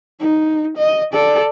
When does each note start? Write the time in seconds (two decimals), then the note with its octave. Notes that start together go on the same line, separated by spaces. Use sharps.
0.20 D#4
0.78 D#5
1.13 A4 D5